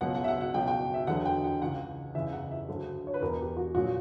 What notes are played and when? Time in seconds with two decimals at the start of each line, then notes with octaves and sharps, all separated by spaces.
0.01 C#2 B2 F#3 F#5
0.15 F#5
0.24 E5
0.28 F#5
0.41 F#5
0.54 C#2 B2 F#3 G5
0.67 G5
0.94 E5
1.07 E2 D3 F#3 F#5
1.25 G5
1.44 F#5
1.61 C#2 C#3 E3 F#5
2.15 F#1 E2 C#3 E3 E5
2.33 F#5
2.51 E5
2.69 D2 D3 F#3
3.07 C#5
3.14 B4
3.21 E1 E2 B2 A#4
3.40 G4
3.57 F#4
3.75 A#1 A#2 F#3 F#4